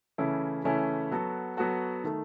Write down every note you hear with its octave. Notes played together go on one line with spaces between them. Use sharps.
C#3 E3 A3 C#4 E4
C#3 E3 A3 C#4 E4
F#3 B3 F#4 A4
F#3 B3 F#4 A4
D#3 A3